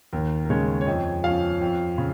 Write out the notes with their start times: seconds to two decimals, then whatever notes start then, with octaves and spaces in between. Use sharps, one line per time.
0.13 D#2 A#4
0.45 A#4
0.50 C#3 G#3 C#4 C#5
0.81 C#5
0.87 F2 D#5
1.24 F3 C#4 F5
1.61 F2
1.98 C#3